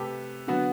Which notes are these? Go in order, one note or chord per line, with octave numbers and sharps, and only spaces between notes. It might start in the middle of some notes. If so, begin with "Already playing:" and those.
Already playing: C3 A3 G4 A4 B4
D3 F#3 B3 F#4